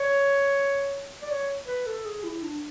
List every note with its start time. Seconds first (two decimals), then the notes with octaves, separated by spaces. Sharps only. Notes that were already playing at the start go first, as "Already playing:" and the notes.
Already playing: C#5
1.22 D5
1.30 C#5
1.67 B4
1.87 A4
2.05 G#4
2.24 E4
2.43 D4